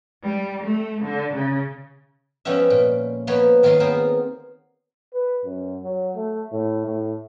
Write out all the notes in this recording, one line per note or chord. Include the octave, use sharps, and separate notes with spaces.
G3
A3
D3
C#3
F3 G3 B3 C#4 B4 E5
A#2
F3 A#3 B3 B4 C#5
D#3 F#3 F4 D#5 F5 A#5
B3 C4 G#4 A#4 C5
B4
F#2
F#3
A3
A2
A2